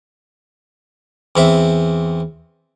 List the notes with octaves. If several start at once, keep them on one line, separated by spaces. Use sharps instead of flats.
E2 C4 E5